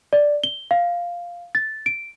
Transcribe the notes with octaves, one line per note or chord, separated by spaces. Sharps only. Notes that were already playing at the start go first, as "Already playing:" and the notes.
D5
G7
F5
A6
D7